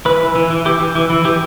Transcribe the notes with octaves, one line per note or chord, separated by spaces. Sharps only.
E3 B4
E3
E3
E3
E3 G4
E3
E3
E3
E3 G4